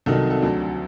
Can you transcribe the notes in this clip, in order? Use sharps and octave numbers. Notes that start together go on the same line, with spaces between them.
C2 C3 D#3 F#3 A4
A4
D2 D3 F#3